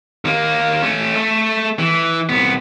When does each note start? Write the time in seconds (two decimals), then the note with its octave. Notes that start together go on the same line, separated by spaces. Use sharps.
0.25 D#2 A#3
0.82 A3 C#4
1.16 A3
1.79 E3
2.29 C2 B3